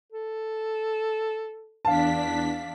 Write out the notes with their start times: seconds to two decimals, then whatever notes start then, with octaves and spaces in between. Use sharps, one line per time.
0.13 A4
1.85 E2 D4 F5 A5 B6